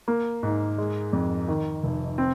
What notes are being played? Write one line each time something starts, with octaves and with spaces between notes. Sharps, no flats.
A#3
G#2
G#3
F2
D#3
F1
C4